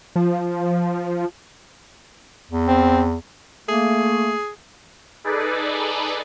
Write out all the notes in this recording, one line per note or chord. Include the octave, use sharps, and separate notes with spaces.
F3
E2
C4
A3 A#3 G#4
D#4 G#4 A4 B4 D5